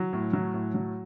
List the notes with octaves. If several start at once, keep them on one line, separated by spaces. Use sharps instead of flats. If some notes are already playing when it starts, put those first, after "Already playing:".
Already playing: F#3
A2
F#3
A2
F#3